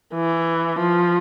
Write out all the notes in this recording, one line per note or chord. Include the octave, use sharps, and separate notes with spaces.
E3
F3